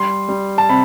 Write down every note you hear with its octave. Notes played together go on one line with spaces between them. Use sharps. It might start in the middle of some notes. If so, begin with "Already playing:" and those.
Already playing: G3 C6
G3
A5
C3 B5